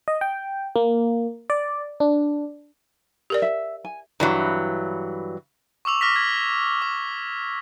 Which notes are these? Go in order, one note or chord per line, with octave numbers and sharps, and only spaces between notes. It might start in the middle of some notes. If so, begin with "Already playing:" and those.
D#5
G5
A#3
D5
D4
G4 A#4 D5
E5
G#5
G2 E3 F#3
C#6 D6 E6 F7
D6 F6 A#6 B6
G#6
D6